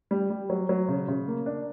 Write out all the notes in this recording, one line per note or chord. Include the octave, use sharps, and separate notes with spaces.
G3
G3
F#3
F#3
C#3
C#3
A#3
D4